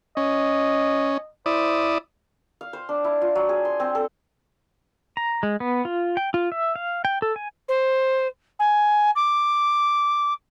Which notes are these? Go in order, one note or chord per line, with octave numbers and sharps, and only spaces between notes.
C#4 D#5
E4 C5 D5 D#6
F5
C5
D4
E4
F4
F#3
G#4
C6
C4
A4
A#5
G#3
B3
F4
G5
F4
E5
F5
G5
A4
G#5
C5
G#5
D6